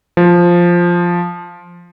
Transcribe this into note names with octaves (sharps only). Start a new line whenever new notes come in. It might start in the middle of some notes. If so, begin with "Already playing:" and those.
F3